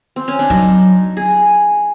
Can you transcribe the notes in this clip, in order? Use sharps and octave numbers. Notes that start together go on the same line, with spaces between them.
C4
C#4
D4
F#3 D#4
G#4